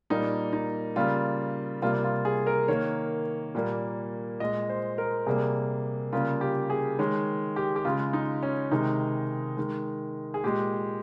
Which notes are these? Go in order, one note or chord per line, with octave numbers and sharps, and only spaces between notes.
A#2 G3 A#3 D#4
D#4
C#3 G3 A#3 F4
C3 G3 A#3 F4
F4
G#4
A#4
D#3 A#3 C#5
A#2 G3 A#3
A#2 G#3 D#5
C5
A#4
C3 G3 A#3 G#4
C#3 G3 A#3 F4
G4
G#4
D#3 G#3 C#5
G4
G4
C#3 G#3 F4
D#4
C#4
C3 D#3 G#3 D#4
D#3 G#3
G#4
A#2 G#3 G4